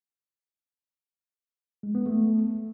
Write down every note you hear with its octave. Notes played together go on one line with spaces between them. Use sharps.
G#3
B3
A3